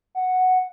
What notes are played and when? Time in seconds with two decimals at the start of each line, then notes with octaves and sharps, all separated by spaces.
0.15 F#5